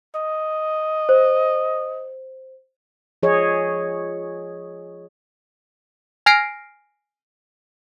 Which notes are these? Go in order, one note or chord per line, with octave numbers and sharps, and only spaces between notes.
D#5
C5
F3 G#4 C#5 D#5
G#5 F6 A#6 C7 D7